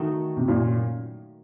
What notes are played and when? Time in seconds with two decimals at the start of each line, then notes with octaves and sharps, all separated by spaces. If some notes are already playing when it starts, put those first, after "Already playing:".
Already playing: D#3 A3 D#4 F#4
0.37 C3
0.48 F#2 A#2